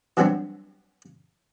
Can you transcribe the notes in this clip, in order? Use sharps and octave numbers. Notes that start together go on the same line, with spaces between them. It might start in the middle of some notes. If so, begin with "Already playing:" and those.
E3 F#3 G3 B3 C4 D4